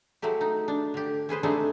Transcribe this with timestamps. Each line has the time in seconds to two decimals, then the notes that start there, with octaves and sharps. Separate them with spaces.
0.22 F#3 G#3 A3 G4
0.41 D#4
0.68 D4
0.94 D3 G4
1.29 C#4 G#4 B4 C5
1.43 G3 A3 C4 D4 D#4 G#4